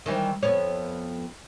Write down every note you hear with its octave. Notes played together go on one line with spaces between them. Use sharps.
D#3 E3 G3
F2 B3 C#5